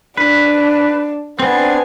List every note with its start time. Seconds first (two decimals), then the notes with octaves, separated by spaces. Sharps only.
0.17 D4 B4
1.40 B3 C4 D4 G#5